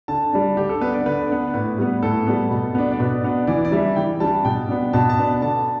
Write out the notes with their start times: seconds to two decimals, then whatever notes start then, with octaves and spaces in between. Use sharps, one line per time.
0.08 D3 A5
0.33 G3 D4
0.57 D3 G4
0.69 A4
0.81 B3 D4 B4
0.94 D5
1.06 D3 B4
1.30 B3 D4
1.54 A2 B4
1.79 G3 B3
2.03 A2 A4
2.27 G3 B3
2.51 B2
2.75 B3 D4
2.92 D5
2.99 B2 B4
3.24 B3 D4
3.47 E3 D5
3.65 D5
3.72 G3 D4 E5
3.96 E3 G5
4.20 G3 D4 A5
4.45 B2 G5
4.69 B3 D4
4.93 B2 A5
5.10 A5
5.18 B3 D4
5.41 D3 A5